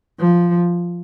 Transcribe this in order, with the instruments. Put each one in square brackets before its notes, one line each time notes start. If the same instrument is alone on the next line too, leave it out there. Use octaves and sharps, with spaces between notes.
[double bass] F3